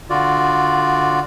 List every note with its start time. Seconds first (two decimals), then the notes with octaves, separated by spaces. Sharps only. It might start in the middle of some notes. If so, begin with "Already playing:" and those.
0.10 D3 F4 F#4 D5